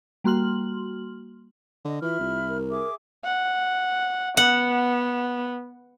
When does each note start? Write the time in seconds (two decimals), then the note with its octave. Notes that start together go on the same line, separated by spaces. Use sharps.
0.24 G3 A#3 F#4 C6 F6 F#7
1.85 D3 D#5
2.02 E3 F4 E5 B5 F6
2.20 C2
2.49 A#4
2.70 G#4 E5 D6
3.25 F#5
4.37 B3 F#5